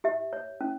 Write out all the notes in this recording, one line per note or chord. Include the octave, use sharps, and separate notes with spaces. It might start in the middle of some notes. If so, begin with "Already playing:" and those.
G4 E5
C#5
C#4